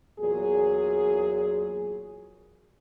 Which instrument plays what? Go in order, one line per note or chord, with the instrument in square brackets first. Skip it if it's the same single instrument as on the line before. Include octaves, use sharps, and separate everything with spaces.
[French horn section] E2 A#2 F#3 G#4